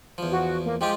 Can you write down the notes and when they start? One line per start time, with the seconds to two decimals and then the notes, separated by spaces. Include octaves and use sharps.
0.18 E2 F3
0.32 F#4
0.66 A#3
0.81 F3 G#3 F4 G4